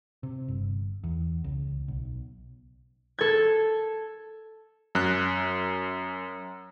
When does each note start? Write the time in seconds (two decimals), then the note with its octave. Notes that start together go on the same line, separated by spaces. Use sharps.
0.23 C3
0.48 G1
1.04 E2
1.44 C#2
1.88 B1
3.19 A4 G#6
4.95 F#2 F#6